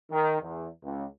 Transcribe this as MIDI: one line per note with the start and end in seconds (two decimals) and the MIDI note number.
0.11 0.35 51
0.41 0.67 40
0.83 1.04 37